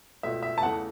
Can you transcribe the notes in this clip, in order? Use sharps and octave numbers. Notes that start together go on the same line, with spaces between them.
C#2 B2 A3 E5
E5
A5
E2 C#3 E3 A3 F#5